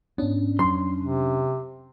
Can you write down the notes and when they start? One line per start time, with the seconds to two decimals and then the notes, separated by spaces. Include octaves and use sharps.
0.18 G#2 B3 C#4 D4
0.59 F2 F#3 C6
1.01 C3